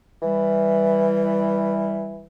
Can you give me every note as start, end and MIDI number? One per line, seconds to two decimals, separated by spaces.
0.23 2.25 52
0.23 2.25 55